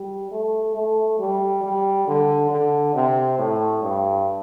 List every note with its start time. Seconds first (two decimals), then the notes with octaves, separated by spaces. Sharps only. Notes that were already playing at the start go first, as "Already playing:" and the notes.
Already playing: G3
0.31 A3
0.75 A3
1.19 G3
1.63 G3
2.07 D3
2.51 D3
2.95 C3
3.39 A2
3.82 G2